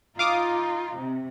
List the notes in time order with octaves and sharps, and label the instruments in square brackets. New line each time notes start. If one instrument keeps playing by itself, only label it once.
[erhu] D#4 [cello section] F4 [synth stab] F5 D6 D#6
[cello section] C3